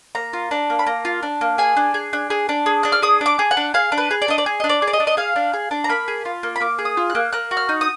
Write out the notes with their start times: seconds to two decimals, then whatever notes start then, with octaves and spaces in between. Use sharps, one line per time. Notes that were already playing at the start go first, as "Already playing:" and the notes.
0.15 A#3 A#5
0.33 F4
0.51 D4
0.70 A#3
0.79 B5
0.86 A#3 A#5
1.05 F4
1.23 D4
1.41 A#3
1.58 G#4 G#5
1.77 D4
1.94 G#4
2.13 D4
2.30 G#4
2.49 D4
2.66 G#4
2.83 D4 F#6
2.92 F6
3.02 G#4 D#6
3.21 D4 D6
3.39 G#4
3.51 F#5
3.57 D4
3.74 G#4 F5
3.92 D4
3.98 B4
4.11 G#4
4.22 D5
4.28 D4 D#5
4.38 D5
4.46 G#4
4.60 D4 D#5
4.69 D5
4.82 G#4
4.87 D5
4.93 D#5
5.00 D4
5.07 D#5
5.17 G#4 F5
5.36 D4
5.54 G#4
5.71 D4
5.84 A#5
5.89 A#3 B5
6.08 G#4
6.25 F4
6.43 A#3
6.56 B5
6.60 A#3 D6
6.79 G#4
6.85 D#6
6.97 F4
7.10 F#6
7.15 A#3
7.33 A#3 F#6
7.51 F#4
7.57 F6
7.69 D#4
7.81 D#6